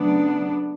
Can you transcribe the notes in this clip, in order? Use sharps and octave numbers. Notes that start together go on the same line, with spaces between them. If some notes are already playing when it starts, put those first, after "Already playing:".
Already playing: C#3 F#3 A3 B3 D4